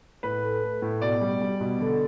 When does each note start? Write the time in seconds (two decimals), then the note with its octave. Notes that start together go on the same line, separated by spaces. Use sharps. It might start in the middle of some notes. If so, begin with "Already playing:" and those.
0.23 A2 B4
0.43 A3
0.63 A3
0.82 A2
1.02 B2 D5
1.21 G3
1.41 G3
1.60 B2
1.80 D3